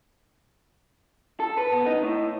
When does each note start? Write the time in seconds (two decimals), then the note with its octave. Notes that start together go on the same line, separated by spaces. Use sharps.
1.40 A4
1.57 B4
1.72 B3
1.86 D#4
2.02 A2